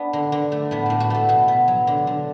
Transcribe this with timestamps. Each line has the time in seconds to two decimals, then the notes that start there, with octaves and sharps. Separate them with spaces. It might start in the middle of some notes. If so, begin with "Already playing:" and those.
Already playing: B3 D4
0.13 D3
0.32 D3
0.52 A3
0.71 A2 B3
0.86 A2 D4
1.00 F#4
1.10 A3 A4
1.29 B2 F#4
1.48 B3
1.68 F#3
1.87 D3
2.07 D3